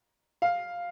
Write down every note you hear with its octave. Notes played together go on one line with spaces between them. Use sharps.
F5